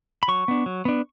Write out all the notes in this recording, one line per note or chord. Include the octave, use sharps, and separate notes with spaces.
B5
F#3 C#6
B3 D4
F#3
B3 D4